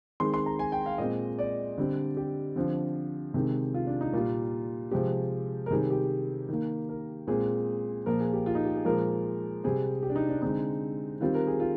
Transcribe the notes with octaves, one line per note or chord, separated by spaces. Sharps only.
D#3 G#3 C4 C6
C6
A#5
G#5
G5
F5
A#2 G#3 C4 D#5
D5
D3 G3 C4
G4
D3 F3 C4
C3 D#3 G#3 C4
F4
D4
D#4
A#2 G3 A#3 F4
C3 F3 G#3 C4 G4
A#4
C3 D#3 G3 C4 G#4
G4
D#3 A#3
A#4
A#2 G#3 C4 G#4
A#2 F3 A#3 A#4
G#4
G4
F4
D#4
G4
G#4
A#2 F3 G#3 A#4
C3 G3 C4 G#4
G4
D4
D#4
D4
D3 G#3 C4 D#4
D#3 G3 C4 F4
A#4
G#4
F4